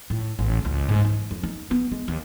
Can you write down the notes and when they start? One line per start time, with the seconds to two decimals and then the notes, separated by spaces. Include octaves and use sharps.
0.10 A2
0.39 A1
0.65 C#2
0.89 G#2
1.05 E3
1.31 F2
1.43 D#4
1.71 B3
1.92 G#3
2.08 D#2